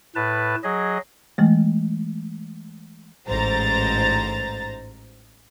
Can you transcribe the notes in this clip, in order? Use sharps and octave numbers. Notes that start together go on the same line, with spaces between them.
A2 B4 A5
F#3 G#4 D#5
E3 G#3 A3
A1 G#2 C5 A#5 A6